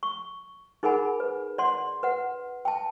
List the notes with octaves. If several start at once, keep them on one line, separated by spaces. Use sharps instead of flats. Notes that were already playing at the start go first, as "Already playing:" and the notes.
C#6
D#4 G#4 A#4 F#5 G#5 B5
B4
D5 F#5 C6
B4 F#5
G5 A5